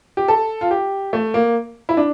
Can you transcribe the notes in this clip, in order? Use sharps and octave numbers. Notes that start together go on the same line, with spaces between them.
G4
A4
F4
G4
A3
A#3
E4
D4